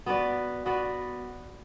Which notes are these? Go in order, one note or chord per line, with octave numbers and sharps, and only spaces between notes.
B3 F#4 B4 D5
B3 F#4 B4 D5